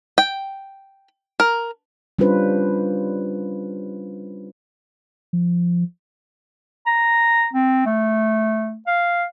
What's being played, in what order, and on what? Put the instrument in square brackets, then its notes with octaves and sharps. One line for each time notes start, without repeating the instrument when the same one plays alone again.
[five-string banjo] G5
A#4
[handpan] G3 C#4 D4 F4 B4 C5
[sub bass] F3
[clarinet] A#5
C4
A3
F5